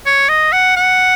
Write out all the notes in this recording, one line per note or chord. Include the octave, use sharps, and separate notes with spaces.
C#5
D#5
F#5
F#5